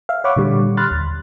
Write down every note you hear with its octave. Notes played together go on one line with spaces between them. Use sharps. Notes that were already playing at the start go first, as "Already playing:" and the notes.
E5 F5
C#5 F#5 B5 C#6 D6
A#2 D3 G3
B5 C6 F6 F#6 A6
D#2